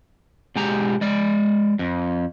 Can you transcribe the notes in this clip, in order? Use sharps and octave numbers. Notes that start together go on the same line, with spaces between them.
B2 G#3 G4 A#5
G#3 D5
F2